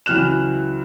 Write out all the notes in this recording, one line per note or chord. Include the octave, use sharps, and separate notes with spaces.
C#2 E3 F#3 F6 F#6 E7